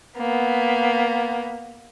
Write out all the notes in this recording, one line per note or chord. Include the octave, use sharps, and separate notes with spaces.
A#3 B3